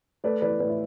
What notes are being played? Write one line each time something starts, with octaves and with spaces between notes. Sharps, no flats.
A3 B4 D5
E3 B4 D5
A2 B4 D5
E4